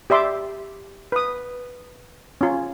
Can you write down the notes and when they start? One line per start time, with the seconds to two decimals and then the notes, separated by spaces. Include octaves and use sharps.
0.10 G4 D5 E5 C6 D6
1.12 B4 D#6
2.41 C#4 F4